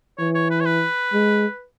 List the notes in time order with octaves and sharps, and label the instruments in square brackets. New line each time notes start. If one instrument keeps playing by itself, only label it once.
[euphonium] E3 [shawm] C#5
[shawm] C#5
B4
C#5
B4
[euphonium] G#3